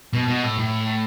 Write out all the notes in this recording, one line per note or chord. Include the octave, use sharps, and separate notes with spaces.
B2
B2
A2
A2